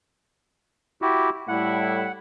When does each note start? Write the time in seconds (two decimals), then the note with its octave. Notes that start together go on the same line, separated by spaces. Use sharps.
1.02 E4 F#4 G4
1.48 A2 G3 E4 F#5